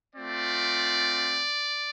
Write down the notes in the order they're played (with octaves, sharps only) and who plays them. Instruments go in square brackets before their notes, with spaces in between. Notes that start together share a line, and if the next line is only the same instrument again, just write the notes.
[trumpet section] A3 C4 F4 D5